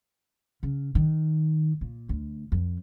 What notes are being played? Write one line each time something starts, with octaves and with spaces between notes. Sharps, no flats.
C#3
D#3
A#2
D2
F2